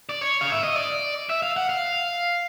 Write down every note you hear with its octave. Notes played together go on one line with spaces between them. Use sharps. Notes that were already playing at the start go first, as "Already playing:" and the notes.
D5
C#5
F5
E5
D#5
D5
E5
F5
F#5
F5